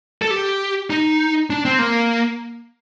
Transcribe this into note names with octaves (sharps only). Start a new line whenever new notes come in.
A4
G4
D#4
D4
C4
A#3